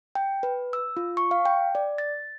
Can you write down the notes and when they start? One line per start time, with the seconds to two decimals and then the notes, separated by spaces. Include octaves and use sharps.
0.15 G5
0.43 B4
0.73 E6
0.97 F4
1.17 C#6
1.31 F5
1.45 G5
1.75 D5
1.98 A6